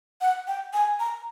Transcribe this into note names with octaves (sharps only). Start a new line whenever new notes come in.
F#5
G5
G#5
A#5